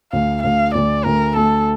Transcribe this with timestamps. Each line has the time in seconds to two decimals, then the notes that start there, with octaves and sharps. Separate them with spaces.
0.12 D2 F5
0.43 D2 F5
0.75 D2 D5
1.05 D2 A#4
1.37 A3 A4